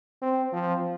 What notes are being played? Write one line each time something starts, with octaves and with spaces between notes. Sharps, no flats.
C4
F3